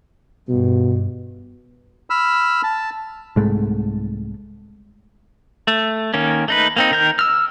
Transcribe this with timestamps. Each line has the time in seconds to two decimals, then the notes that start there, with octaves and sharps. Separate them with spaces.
0.49 G2 B2
2.10 B5 E6 F6
2.63 A5
3.36 C2 G#2 G#3 A3
5.67 A3
6.14 D#3 A#3 C#4
6.48 A3 D#4 B4
6.77 A#3 C4 D#4
6.91 D#3 A#4 G6
7.19 E6 F6